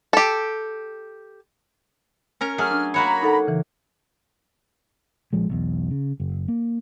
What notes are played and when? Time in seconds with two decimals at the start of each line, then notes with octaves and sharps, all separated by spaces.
0.13 G4 A4
2.41 C#4 A#4 A#5
2.58 F#3 A3 G#4 F6
2.71 D4
2.94 A#3 F#4 C#5 A#5 B5
3.23 D#4 A4 F#5
3.47 C#3 E3
5.33 A#1 F3 G#3
5.49 B1 E2
5.91 C#3
6.20 F#1
6.48 A#3